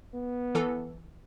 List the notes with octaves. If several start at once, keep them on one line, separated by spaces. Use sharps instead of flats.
B3
E3 A4